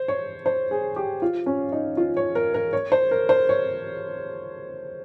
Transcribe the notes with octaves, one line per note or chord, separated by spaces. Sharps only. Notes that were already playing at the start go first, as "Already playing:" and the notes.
Already playing: C5
C#5
C5
G#4
G4
F4
C#4
D#4
F4
C#5
A#4
A#4
C#5
C5
A#4
C5
C#5